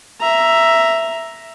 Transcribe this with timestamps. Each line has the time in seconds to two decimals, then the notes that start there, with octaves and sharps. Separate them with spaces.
0.21 E5 A#5